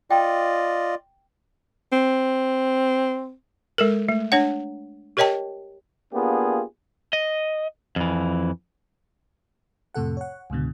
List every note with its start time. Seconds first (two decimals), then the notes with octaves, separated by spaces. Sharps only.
0.10 F4 D5 D#5 G5
1.93 C4
3.78 G#3 A4 A#4
4.09 A3
4.32 D4 C#5 F#5
5.17 G4 A#4 C#5 D#5 G5 A5
6.13 A#3 B3 D4 F4 G4 G#4
7.13 D#5
7.96 F2 E3
9.94 F2 A2 C3 A4 F#5
10.17 C#5 F#5
10.50 C#2 G#2 B2 D3